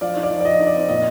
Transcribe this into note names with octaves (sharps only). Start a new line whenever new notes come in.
F3 D5 F5
D#4
D5
F3
D5
F3 D#5
D#4
D5
C4
A#2 D#5